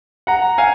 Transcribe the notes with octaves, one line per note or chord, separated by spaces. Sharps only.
F#5 A#5
F5 G#5